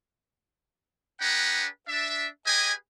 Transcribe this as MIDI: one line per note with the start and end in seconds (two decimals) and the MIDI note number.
1.20 1.66 62
1.20 1.66 68
1.20 1.66 71
1.20 1.66 78
1.20 1.66 79
1.20 1.66 82
1.88 2.26 62
1.88 2.26 76
2.46 2.72 67
2.46 2.72 68
2.46 2.72 71
2.46 2.72 75
2.46 2.72 79
2.46 2.72 80